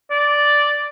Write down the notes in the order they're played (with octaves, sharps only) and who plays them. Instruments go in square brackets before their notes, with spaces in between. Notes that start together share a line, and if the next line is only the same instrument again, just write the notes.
[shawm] D5